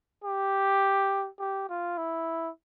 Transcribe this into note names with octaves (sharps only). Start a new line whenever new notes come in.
G4
G4
F4
E4